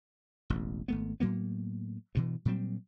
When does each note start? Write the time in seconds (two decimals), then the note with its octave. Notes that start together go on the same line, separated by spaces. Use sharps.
0.50 E1 A1
0.88 G#1 A3 B3
1.20 A2 F#3 A#3 B3
2.15 G2 B2 E3
2.45 A#2 F#3 G3 C4